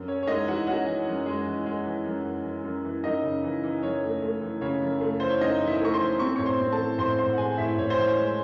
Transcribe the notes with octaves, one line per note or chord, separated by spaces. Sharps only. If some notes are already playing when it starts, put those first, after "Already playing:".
Already playing: F#2
C#4 C#5
C#5
G#3 D#4 D#5
E3 F#4 F#5
C#4 F#4 F#5
E3
F#2
G#3
E3
G#3
E3
F#2
E3
E3
F#2
E3
F#2 D#4 D#5
C#3
E3
E3
F#2 C#5
A3
A3
E3
C#3 C#5
F#2
A3
E3 C5
C#5
F#2 D#4 D#5
E3
E4 E5
A3 C#6
C5 C6
E3
C4 C#6
C#5 C#6
A2
C5 C6
C4
A4 A5
E3
A2 C5 C6
A2 C5 C6
F#5
E3 G#4 G#5
A2 E4 E5
A2 C#5
C5
E3
C#5
G#3